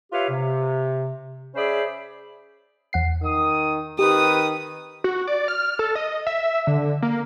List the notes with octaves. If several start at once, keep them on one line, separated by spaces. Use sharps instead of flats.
F4 G4 B4 C#5 E5 F5
C3
C#4 G#4 C5 D5 E5 B5
E2 F#5 C7
D#3 D#6
D#3 C4 G4 B4 D#6
F#4
D5
F6
A4
D#5
E5
D3
A#3